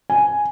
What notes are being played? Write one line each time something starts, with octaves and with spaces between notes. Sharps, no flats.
G#5